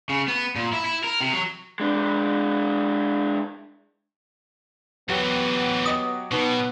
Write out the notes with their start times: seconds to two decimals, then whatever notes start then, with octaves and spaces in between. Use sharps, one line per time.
0.09 C#3
0.28 B3
0.56 A#2
0.73 E4
0.85 E4
1.04 A#4
1.21 C3
1.33 F#3
1.80 G#3 D4
5.09 D2 E3 F#3 B3 F#4 G4
5.86 D#5 D#6
6.31 B2 B3 D#4 C#6